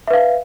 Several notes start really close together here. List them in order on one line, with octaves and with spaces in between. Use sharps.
E5 B4 F5